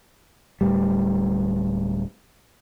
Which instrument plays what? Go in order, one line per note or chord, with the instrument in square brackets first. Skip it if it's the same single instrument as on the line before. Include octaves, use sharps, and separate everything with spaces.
[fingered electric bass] D1 A2 G3